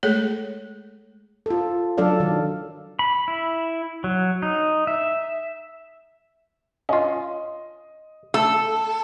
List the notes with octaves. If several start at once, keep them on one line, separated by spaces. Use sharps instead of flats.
G#3 A3 G#4 A4 C#5
F4 A4
F#3 D4 A4 D5 F5
D#3
B5
E4
F#3
D#4
E5
C#4 F4 D#5
A3 A4 E6